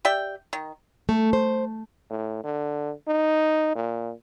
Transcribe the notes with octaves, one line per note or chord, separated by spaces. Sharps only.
G4 D5 E5 G5
D#3
A3
C5
A2
D3
D#4
A#2